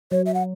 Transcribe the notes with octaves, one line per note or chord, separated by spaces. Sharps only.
F#3 C#5
E5
F#5